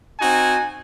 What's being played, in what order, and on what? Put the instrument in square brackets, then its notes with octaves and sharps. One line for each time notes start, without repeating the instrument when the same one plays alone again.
[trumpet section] C4 D#4 F#4 G#5